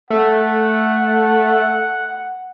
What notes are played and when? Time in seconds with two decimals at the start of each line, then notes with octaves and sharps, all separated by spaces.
0.10 A3 F#5